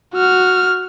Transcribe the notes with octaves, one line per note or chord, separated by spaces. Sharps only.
F#4 F6